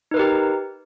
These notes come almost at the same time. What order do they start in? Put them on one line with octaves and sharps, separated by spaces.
D#4 B4 A#4 G4